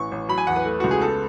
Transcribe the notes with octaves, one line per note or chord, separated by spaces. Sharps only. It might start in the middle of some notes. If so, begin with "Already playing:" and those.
Already playing: A1 E3 C#6
A1
F#3 B5
G#5
E2 F#5
B4
A3
C#2 F#4
G#4
B3 A4